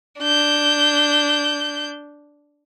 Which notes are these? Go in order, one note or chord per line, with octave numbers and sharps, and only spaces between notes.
D4 G6